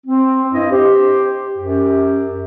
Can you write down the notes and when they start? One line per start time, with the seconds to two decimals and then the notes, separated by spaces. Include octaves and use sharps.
0.07 C4
0.52 G2 E4 D#5
0.71 G4 C5
1.57 F#2 G4